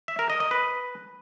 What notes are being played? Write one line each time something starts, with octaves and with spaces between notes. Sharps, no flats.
E5
A#4
D#5
D#5
B4